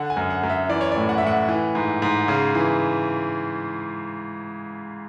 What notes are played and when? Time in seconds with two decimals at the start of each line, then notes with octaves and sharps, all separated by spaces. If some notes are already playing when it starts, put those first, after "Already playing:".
Already playing: D3 F#5
0.10 G#5
0.17 F#2
0.30 F#5
0.43 F#2
0.50 E5
0.69 E3 D5
0.81 C#5
0.92 A2 D5
1.09 F#5
1.18 E5
1.23 A2 F#5
1.49 E3
1.75 G#2
2.02 G#2
2.28 C#3
2.55 E3